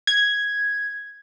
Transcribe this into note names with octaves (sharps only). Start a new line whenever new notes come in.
G#6